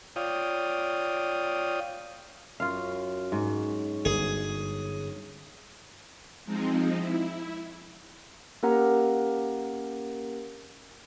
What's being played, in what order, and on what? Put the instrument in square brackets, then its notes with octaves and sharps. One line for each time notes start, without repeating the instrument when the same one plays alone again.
[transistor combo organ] F4 C#5 D5 F5 G5 D#6
[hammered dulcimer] F#2 [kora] F4 F5
[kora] G#2 [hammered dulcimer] F#4
[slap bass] G1 [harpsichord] G#4
[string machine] F3 G#3 C4 D#4
E4
[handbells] A#3 C#4 G4 A#4 F#5 A#5